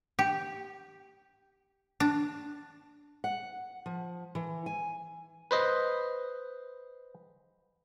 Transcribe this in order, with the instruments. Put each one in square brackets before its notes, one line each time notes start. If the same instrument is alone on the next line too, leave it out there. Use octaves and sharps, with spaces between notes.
[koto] G4
D4
[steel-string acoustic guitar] F#5
F3
E3
G#5
[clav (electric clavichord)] B4 C5 D#5